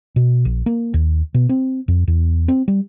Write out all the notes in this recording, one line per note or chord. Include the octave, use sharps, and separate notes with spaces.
B2
A#1
A#3
D#2
B2
C4
F2
E2
C4
G3